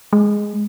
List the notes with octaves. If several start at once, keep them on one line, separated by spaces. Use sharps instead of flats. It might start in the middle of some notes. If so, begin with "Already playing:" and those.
G#3